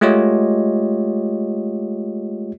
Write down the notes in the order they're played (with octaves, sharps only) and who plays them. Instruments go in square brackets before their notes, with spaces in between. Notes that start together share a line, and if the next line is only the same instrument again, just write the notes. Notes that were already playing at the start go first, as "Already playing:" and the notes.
[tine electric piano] G#3 A3 F4 G4 C#5 D#5